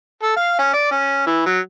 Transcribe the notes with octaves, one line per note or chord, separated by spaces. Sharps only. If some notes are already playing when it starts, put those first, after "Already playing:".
A4
F5
C#4
D5
C#4
E3
F#3